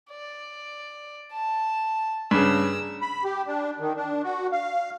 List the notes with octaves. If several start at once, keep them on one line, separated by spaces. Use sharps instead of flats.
D5
A5
G2 C#3 A#5 E6
B5
G4
D4
D#3
D4
F#4
F5